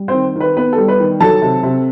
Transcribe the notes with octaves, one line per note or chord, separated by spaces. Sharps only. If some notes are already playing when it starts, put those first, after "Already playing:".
Already playing: G3
C4 C5
D#3
D#3 B4
B3 B4
A4
G3
B4
D#3
F#3 A4 A5
C3
C3